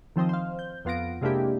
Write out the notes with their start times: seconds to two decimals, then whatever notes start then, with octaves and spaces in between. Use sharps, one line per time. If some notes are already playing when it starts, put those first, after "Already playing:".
0.16 D#3 F3 C4 C5 D#5
0.29 C5 F5
0.59 G6
0.85 F2 B3 F4 F#5 A#6 D7
1.21 C3 G#3 A#3 D4 E4 G4